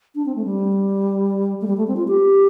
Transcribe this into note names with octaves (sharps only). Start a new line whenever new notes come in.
D4
C4
A3
G3
A3
G3
A3
C4
F4
G4